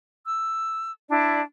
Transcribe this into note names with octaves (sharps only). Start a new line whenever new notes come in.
E6
D4 E4 D5